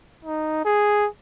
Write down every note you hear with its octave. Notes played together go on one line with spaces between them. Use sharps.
D#4
G#4